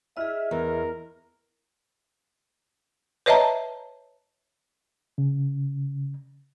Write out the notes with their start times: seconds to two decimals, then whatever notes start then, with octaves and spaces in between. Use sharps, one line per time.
0.17 E4 G#4 D#5 E5 F6
0.51 E2 A#4
3.26 B4 C#5 D#5 E5 A5 A#5
5.18 C#3